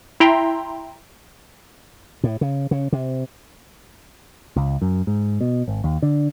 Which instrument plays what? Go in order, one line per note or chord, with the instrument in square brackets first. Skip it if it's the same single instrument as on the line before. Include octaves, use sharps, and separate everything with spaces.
[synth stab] E4 E5 G5 A#5 C6
[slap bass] A2
C#3
C#3
C3
[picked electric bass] C#2
F#2
G#2
B2
G#1
D#2
D3